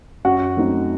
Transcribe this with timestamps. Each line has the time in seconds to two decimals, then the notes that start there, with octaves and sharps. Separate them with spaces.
0.25 F#2 F#4 F#5
0.57 F#3 A3 C4 D#4